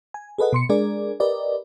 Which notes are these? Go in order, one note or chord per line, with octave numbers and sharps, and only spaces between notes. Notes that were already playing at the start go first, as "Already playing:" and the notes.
G#5
G#4 A4 B4 D#5 F#5
B2 C6 C#7
G#3 D4 G#4 A#4 D5
G4 A#4 B4 D5 D#5